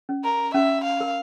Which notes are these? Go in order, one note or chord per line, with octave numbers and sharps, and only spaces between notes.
C#4
A#4
C#4 E5
F5
A#4